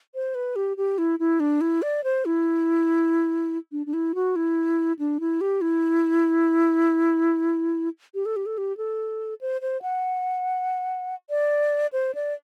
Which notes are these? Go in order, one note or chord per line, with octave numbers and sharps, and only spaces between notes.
C5
B4
G4
G4
E4
E4
D4
E4
D5
C5
E4
D4
D4
E4
F#4
E4
D4
E4
G4
E4
G4
A4
G4
A4
G4
A4
C5
C5
F#5
D5
C5
D5